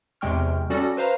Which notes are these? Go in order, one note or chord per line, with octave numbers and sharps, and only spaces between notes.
E2 C3 G#3 G5 C#6 F6
G3 C#4 F#4 A4 D5 A#6
B4 C5 F5 A#5